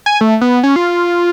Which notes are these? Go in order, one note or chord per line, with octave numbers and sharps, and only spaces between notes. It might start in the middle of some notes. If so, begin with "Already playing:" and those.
G#5
A3
B3
C#4
F4